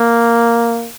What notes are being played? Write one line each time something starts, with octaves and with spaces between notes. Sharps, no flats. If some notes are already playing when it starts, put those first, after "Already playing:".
Already playing: A#3